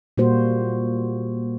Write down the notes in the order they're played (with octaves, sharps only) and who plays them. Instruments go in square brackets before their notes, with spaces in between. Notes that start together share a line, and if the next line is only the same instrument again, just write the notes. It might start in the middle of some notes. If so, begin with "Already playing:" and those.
[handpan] A#2 G3 A#3 F#4 C5